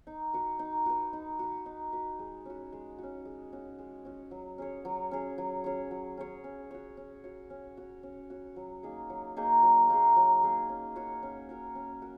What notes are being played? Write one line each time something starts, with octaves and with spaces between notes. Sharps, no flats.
D#4
F#4 B4
D#4
F#4 B4
D#4
F#4 B4
D#4
F#4 B4
G#3
C#4 F#4
G#3
C#4 F#4
G#3
C#4 F#4
G#3
C#4 F#4
F#3
C#4 G#4 C#5
F#3
C#4 G#4 C#5
F#3
C#4 G#4 C#5
F#3
C#4 G#4 C#5
C#4
F#4 C#5
C#4
F#4 C#5
C#4
F#4 C#5
C#4
F#4 C#5
F#3
A#3 D#4 G#4
F#3
A#3 D#4 G#4
F#3
A#3 D#4 G#4
F#3
A#3 D#4 G#4
C#4
F#4 A#4 C#5
C#4
F#4 A#4 C#5
C#4
F#4 A#4